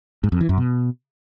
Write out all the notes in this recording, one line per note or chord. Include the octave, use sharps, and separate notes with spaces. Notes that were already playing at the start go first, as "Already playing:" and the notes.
G#2
F2
E3
F#2
B2